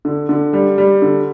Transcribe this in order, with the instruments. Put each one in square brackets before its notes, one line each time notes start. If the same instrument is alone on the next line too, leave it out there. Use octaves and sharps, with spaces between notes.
[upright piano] D3
D3
G3
G3
D3